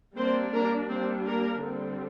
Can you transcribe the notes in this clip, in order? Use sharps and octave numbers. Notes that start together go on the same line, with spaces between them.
G3 A#3 C4 D4 C5
A#3 A#4
G3 A#3 C4 D4 C5
A#3 A#4
D3 G3 C4